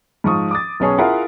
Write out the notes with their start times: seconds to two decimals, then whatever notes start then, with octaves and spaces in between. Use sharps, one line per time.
0.24 G#2 F3 C#6 D#6
0.51 D6 D#6 A6
0.80 B1 B3 C#4 G#4 A5 C#6
0.98 E4 F4 G#4 A#4 F5 F#5